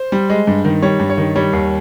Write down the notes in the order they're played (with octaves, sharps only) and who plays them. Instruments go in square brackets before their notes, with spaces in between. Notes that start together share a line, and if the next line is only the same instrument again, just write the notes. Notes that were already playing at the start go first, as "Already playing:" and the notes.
Already playing: [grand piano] C5
G3
G#3
G2
D#3
G3 C#5
G2
C#5
D#3
G3 C#5
D#2